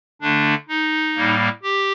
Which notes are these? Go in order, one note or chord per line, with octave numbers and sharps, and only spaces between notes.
D3 A3 D4
D#4
A2 G3 A#3
G4